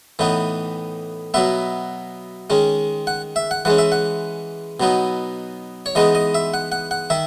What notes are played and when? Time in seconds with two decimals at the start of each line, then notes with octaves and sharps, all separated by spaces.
0.19 A2 E3 B3 D#4
1.34 B2 F#3 B3 E5
2.50 D#3 G#3 C#4
3.07 F#5
3.36 E5
3.51 F#5
3.65 E3 G#3 C#4 F#5
3.78 E5
3.92 F#5
4.80 B2 F#3 B3 D#4
5.86 C#5
5.95 E3 G#3 B3 D#4 D#5
6.15 D#5
6.34 E5
6.54 F#5
6.72 F#5
6.91 F#5
7.10 D#3 E5